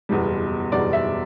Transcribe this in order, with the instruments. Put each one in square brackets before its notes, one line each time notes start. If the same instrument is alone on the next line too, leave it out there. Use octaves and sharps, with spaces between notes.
[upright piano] F#1 E2 B2 G3
F#1 E2 B2 G3 D5
E5